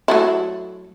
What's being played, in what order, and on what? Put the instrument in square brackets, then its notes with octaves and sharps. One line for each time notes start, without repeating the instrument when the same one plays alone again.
[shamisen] F#3 A3 E4